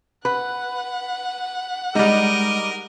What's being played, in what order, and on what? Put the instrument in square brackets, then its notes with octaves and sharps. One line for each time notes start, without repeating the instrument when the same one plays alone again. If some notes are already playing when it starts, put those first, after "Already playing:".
[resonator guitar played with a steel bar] B4 [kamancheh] F#5
[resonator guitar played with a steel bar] G3 D#4 [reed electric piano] G#3 [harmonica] A#4 D#5 D6